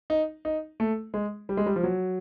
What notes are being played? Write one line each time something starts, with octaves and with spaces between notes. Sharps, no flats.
D#4
D#4
A3
G#3
G3
G#3
G3
F3
F#3